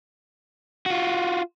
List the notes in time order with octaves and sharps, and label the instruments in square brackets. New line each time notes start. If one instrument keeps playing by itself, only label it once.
[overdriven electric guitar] F4 F#4